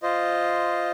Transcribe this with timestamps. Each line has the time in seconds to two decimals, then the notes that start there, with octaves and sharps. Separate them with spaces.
0.02 F4 C5 D#5